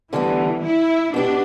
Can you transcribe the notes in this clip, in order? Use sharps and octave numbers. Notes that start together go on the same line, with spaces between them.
D2 D3 E3 G3 B3
E4
B2 B3 D4 G4